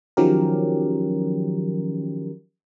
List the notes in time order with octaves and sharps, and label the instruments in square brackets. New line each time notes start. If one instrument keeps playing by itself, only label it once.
[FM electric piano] D#3 F3 F#3 C#4 G4 A#4